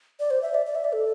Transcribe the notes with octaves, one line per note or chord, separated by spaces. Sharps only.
D5
C5
E5
D5
D5
E5
D5
A4